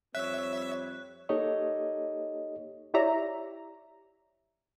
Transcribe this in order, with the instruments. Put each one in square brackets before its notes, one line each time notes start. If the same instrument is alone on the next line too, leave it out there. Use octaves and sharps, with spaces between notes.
[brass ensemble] F2 G3 C4 [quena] C#5 [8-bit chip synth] E5 [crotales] F#6
[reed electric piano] A#3 D#4 G4 A4 C#5 D#5
[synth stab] E4 G4 C#5 D5 E5 A#5